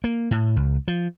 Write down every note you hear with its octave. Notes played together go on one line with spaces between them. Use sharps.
A#3
A2
C#2
F3